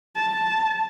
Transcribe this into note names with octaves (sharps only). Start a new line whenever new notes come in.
A5